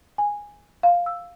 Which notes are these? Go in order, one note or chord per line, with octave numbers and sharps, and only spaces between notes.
G#5
F5
E6